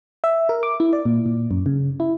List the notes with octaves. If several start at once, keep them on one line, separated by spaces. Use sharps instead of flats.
E5
A#4
D6
E4
D5
A#2
A#2
F#2
C#3
E4